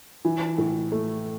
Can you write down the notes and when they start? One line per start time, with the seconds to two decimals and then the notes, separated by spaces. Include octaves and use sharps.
0.25 E3
0.58 A2
0.92 A3